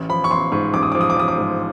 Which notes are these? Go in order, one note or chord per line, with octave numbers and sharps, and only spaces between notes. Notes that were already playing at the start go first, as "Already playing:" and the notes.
Already playing: A1
F3 B5
C#6
A1 C6
G#2 C#6
A1 D6
D#6
F3 D6
D#6
D6
A1 D#6
D6
G#2